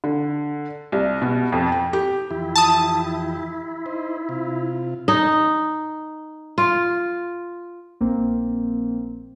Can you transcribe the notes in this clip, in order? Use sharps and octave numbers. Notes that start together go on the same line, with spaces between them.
D3
C2
B2
F2
G5
G4
F2 E3 E4 G4
A5 D#6
D#4 C5
C3 F4
D#4
F4
A#1 A#3 C4